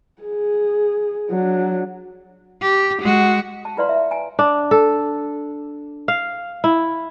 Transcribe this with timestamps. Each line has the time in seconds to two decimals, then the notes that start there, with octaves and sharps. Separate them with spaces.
0.22 G#4
1.30 F#3 D4
2.61 G4
3.02 G#3 F#4
3.65 A5
3.77 E4 F4 B4 D5 F5 C6
3.89 E5
4.11 G#5 A#5
4.39 D4
4.71 A4
6.08 F5
6.64 E4